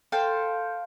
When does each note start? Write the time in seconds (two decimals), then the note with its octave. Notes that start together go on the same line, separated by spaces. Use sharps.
0.12 A4 C5 F5 G5